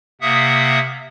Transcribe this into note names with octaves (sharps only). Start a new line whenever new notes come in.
C3 A#3 E5 F#5 D#6